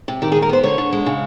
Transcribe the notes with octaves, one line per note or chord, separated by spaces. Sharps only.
C3
D#3 G4
G#4
D#2
A#4
B3 C5
D3 C#5
D3
G#3
C#3